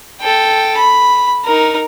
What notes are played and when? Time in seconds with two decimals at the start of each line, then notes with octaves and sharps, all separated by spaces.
0.21 A4 G5
0.78 B5
1.45 D#4 A#4